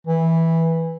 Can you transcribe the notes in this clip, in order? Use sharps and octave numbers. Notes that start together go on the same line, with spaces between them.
E3